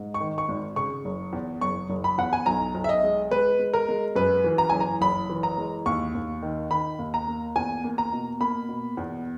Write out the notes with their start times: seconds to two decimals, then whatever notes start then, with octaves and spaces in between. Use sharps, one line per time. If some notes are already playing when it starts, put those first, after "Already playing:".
Already playing: G#2
0.14 C#6
0.20 D#3
0.38 C#6
0.49 G#1
0.76 C#3 C#6
1.05 F#1
1.33 E2
1.61 F#1 C#6
1.90 F#1
2.04 B5
2.18 E2 F#5
2.33 G#5
2.46 B1 A#5
2.75 B1
2.84 E5
2.89 D#5
3.03 G#3
3.31 G#3 B4
3.59 G#3
3.73 A#4
3.89 G#3
4.16 F#2 B4
4.44 E3
4.58 A#5
4.70 F#1 G#5
4.80 A#5
5.01 F#1 B5
5.29 E3
5.43 A#5
5.57 G#3
5.86 D#2 C#6
6.15 D#2
6.42 D#3
6.71 D#3 B5
6.99 D#2
7.14 A#5
7.27 A#3
7.56 E2 G#5
7.84 A#3
7.98 A#5
8.12 B2
8.41 A#3 B5
8.69 B2
8.97 E2